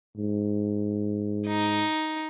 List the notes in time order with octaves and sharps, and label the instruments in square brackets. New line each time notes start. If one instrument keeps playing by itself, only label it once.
[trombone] G#2
[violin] D#4